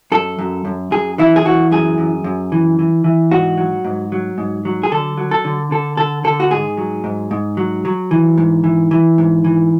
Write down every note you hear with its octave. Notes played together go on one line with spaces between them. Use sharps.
F#2 A4
F#2
F#2
F#2 G#4
E3 E4
G#4
E3 F#4
F#2 G#4
F#2
F#2
E3
E3
E3
G#2 F#4
F#3
G#2
F#3
G#2
F#3
G#4
D3 A4
F#3
A4
D3
D3 A4
D3 A4
D3 A4
F#4
G#2 G#4
F#3
G#2
G#2
F#3
F#3
E3
G#2
E3
E3
G#2
E3